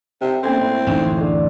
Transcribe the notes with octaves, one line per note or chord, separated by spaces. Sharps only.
C3 E5 G5
A#3 C4 C#4 A4
A2 E4
D1 A1 F#2 C#4 D#4
D3 F5 D6